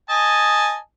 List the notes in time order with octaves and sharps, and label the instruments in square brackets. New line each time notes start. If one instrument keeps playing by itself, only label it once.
[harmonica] D#5 G#5 A5